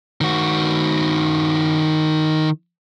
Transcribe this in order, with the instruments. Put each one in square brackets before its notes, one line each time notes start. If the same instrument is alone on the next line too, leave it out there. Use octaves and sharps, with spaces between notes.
[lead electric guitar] D#3 F#4